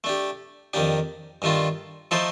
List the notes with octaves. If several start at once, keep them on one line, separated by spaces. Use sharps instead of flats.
A3 D4 G4
F2 D#3 A#3 D4 G4
G2 D#3 A3 D4 F4
F3 A3 D#4 A4 C5